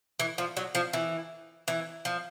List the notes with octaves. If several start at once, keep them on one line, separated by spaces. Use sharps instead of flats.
E3
F3
F#3
F3
E3
E3
F3